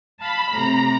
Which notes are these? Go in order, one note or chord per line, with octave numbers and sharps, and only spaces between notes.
F5 A5 B5
A2 C3 A#5